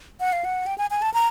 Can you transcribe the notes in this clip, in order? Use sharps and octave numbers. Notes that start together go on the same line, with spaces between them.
F#5
F5
F#5
G5
G#5
G#5
A5
A#5